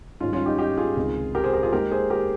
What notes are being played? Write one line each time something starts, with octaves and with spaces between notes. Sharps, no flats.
G#2 D#3 G3 C#4 F4
C#4 F4
D#4 G4
D#4 G4
F4 G#4
C#2 C3 D#3
G4 A#4
G#4 C5
G4 A#4
F4 G#4
D#2 D#3 G#3 G4 A#4
G#4 C5
G4 A#4